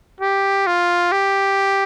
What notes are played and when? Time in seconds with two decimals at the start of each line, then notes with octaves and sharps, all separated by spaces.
0.21 G4
0.67 F4
1.12 G4